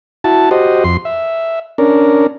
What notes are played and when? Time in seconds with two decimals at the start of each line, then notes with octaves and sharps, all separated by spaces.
0.24 E4 F#4 A5
0.51 F#4 G4 C5 D#5
0.84 F2 C6
1.05 E5
1.78 C#4 D4 A#4